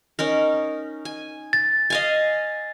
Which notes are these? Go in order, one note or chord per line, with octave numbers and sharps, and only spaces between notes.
C#4 D#4 A#4
G#5
A6
D#5 F5 G#5